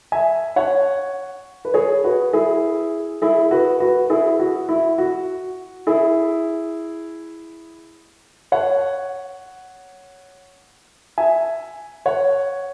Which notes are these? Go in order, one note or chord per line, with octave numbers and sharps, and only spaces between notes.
E5 G#5
C#5 F#5
B4
G#4 C#5
F#4 B4
E4 G#4
E4 G#4
F#4 B4
F#4 B4
E4 G#4
F#4
E4
F#4
E4 G#4
C#5 F#5
E5 G#5
C#5 F#5